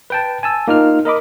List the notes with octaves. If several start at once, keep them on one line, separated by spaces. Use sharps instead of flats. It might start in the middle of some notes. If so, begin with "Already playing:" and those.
B4 G5 A5
G#5 A5 E6
A#3 D#4 F4 F6
A#4 D#5 B5 D6